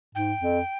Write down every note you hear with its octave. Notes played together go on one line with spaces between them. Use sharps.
G#2 G5
F2